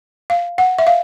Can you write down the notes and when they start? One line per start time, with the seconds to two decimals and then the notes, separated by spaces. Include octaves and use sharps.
0.30 F5
0.58 F#5
0.78 E5
0.87 F5